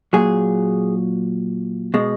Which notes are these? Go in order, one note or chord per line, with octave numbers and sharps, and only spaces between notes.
A#2 F#3 G#4
B2 G#3